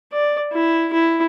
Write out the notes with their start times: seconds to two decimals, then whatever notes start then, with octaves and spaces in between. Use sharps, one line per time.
0.13 D5
0.52 E4
0.93 E4